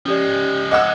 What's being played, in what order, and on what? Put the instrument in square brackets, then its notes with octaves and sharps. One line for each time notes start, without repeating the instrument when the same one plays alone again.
[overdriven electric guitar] F3 G#3 [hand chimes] C#4 G4 D5
[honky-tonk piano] D#5 F#5 E6 [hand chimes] D6